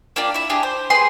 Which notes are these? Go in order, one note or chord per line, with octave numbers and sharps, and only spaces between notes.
A#3 D4 F4 G4
E4 E5
D4 E4 G4 G#4
C5
G4 G#4 B4 C6